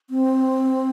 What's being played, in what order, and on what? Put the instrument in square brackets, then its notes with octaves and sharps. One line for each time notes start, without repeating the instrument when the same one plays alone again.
[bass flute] C4